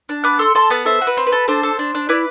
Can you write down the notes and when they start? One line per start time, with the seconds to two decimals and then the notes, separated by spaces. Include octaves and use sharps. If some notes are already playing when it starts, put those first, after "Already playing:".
0.09 D4
0.24 B3 D6 F#6
0.39 A4 C6 E6
0.55 A4 A5 C6
0.70 B3 F#5 A5
0.86 A4 C5 E5
1.01 F#4
1.07 B4
1.17 C4
1.27 B4
1.32 A4
1.48 D4 A4 C5
1.63 A4
1.79 D4
1.95 D4
2.09 E4 B4 D5